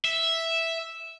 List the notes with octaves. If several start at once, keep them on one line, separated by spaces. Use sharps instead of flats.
E5